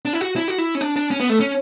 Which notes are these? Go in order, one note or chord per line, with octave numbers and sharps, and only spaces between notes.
D4
E4
F#4
E4
F#4
E4
C#4
D4
D4
C#4
B3
A3
C#4